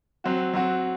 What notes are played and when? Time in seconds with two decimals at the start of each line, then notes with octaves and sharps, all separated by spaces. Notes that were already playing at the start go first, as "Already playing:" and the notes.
0.24 F#3 C4 F#4
0.54 F#3 C4 F#4